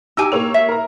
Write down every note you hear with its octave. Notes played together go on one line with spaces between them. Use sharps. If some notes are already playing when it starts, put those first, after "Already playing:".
D#4 G4 G#5 E6
A#3 C#5 F7
E5
A#4 A#5